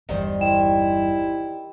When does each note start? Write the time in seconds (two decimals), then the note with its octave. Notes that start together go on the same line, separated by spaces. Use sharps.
0.09 G1 E2 G2 D#3 G3 C5
0.40 E4 D#5 G5 E7